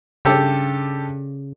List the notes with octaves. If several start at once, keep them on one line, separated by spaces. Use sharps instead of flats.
G2 C#3 G4 A4